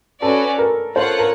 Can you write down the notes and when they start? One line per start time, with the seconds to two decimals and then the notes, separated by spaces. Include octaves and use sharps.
0.22 C#4 F#4 A4 B4 D5
0.58 A#4
0.95 F4 A4 C5 C#5 F#5
1.19 A#4